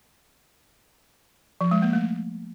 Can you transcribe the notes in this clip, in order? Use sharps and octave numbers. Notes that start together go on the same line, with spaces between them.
F3
G#3
A#3
A3